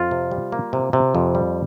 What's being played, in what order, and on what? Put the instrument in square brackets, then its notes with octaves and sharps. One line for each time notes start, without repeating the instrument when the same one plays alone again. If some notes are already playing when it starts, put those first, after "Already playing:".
Already playing: [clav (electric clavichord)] F2 F4
C3
G3
A#3
C3
C3
F2
G3